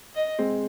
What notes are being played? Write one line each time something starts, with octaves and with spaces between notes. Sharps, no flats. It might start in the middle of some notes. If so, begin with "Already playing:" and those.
D#5
G#3 C4